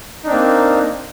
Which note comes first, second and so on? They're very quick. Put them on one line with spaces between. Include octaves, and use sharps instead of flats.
D#4 D4 C4 A#3